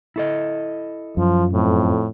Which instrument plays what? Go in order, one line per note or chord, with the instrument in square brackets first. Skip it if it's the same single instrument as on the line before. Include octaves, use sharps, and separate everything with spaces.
[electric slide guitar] E4 A4 D#5
[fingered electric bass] F#2 [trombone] F3 [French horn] F4
[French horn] F2 [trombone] A2